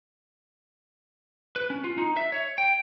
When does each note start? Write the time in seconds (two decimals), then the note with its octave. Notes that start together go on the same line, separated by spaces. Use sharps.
1.56 B4
1.70 C#4
1.84 F4
1.98 D#4
2.17 E5
2.32 C#5
2.58 G5